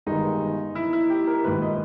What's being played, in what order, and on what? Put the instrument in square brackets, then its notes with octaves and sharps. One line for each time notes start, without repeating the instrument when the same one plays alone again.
[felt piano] G1 G2 D#3 G#3 [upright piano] D#4
[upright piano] E4
E4
G4
A#4
[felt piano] A#1 G#2 D#3 [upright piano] B4
[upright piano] D#5